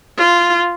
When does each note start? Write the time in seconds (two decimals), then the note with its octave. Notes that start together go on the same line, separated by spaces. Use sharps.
0.18 F4